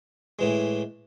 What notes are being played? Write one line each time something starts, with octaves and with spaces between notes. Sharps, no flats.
A2 E3 G#3